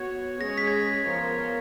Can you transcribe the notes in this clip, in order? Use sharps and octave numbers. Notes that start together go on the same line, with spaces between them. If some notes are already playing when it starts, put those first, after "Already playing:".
Already playing: B3 F#4 C#5 G#6
G#3 C#4 G#4 C#5 A#6
B6
G#6
A#6
F3 B3 F4 A#4 C#5